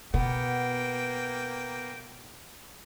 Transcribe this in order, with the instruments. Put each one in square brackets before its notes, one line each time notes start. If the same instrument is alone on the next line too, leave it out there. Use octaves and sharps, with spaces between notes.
[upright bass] B2 [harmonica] A#3 G5 [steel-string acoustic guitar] B3